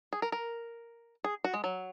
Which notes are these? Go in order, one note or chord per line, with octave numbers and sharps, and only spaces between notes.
G#4
A#4
A#4
G#4
F#4
G#3
F#3